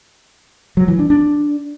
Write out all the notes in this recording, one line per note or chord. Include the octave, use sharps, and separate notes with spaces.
F#3
E3
D4
D4